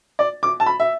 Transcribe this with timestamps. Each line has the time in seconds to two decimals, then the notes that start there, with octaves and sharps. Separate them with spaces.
0.19 D5
0.43 D6
0.60 A5
0.66 B5
0.80 E5